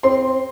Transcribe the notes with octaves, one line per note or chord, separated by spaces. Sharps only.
C4 C6